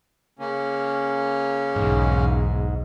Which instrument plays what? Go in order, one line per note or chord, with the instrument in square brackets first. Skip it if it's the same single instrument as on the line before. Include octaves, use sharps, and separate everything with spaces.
[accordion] C#3 A#3 C#4
[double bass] B1 E2 [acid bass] G#2